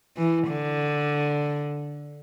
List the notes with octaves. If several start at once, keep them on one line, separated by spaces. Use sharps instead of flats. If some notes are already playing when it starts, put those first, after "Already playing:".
E3
D3